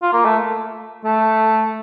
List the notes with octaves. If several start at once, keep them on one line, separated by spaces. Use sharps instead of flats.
F4
A#3
A3
A3